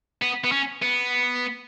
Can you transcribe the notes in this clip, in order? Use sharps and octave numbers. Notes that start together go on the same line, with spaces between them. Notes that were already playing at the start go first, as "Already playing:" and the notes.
B3
B3
C#4
B3